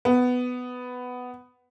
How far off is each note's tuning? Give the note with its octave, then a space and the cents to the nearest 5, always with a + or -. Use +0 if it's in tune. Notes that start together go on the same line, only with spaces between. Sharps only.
B3 +10